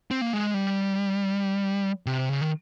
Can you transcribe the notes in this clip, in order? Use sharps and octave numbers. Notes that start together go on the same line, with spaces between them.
C4
A#3
G#3
G3
C3
C#3
D#3